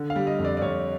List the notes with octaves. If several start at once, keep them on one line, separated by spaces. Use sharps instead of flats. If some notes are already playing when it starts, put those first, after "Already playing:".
Already playing: D3
F5
G3
D#5
F2
D5
D5
F2 C#5